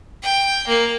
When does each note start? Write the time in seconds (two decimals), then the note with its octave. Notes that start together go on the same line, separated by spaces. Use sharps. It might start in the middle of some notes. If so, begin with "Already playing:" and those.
0.23 G5
0.67 A#3